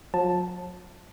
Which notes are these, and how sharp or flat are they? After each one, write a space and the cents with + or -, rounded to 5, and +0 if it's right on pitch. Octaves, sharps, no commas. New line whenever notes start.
F3 +45 A5 +0